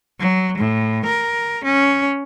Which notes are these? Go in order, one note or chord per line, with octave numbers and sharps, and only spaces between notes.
F#3
A2
A#4
C#4